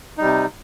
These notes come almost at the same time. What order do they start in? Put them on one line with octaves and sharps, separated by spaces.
D#4 G3 C3